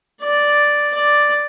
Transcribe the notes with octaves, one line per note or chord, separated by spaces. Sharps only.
D5
D5